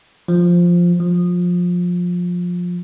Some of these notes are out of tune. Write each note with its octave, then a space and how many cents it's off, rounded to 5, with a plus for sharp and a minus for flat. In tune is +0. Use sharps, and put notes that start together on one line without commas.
F3 +0
F3 +20